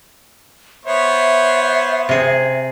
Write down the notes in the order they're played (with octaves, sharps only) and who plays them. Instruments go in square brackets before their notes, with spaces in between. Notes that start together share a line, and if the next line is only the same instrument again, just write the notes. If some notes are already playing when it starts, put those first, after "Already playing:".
[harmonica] B3 C5 C#5 [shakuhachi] E5
[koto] C3 G#4